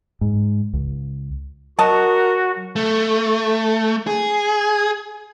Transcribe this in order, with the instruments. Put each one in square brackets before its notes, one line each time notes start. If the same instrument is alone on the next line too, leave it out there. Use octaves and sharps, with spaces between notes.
[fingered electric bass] G#2
C#2
[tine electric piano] F#3 [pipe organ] F#4 [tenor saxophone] A#4 [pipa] D#5 A5
[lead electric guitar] A3
G#4